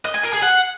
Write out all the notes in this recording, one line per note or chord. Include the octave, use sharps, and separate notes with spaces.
D#5
G#5
A#4
G#4
F#5